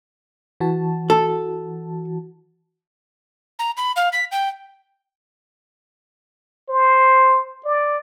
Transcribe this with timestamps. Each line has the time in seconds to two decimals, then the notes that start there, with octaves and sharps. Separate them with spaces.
0.60 E3 F#4 A5
1.10 A4
3.59 A#5
3.77 B5
3.96 F5
4.13 B6
4.32 G5
6.69 C5
7.65 D5